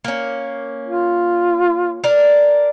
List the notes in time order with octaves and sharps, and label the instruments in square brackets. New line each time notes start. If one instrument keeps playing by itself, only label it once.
[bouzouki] A#3 C#4
[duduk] F4
[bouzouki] D4 A#4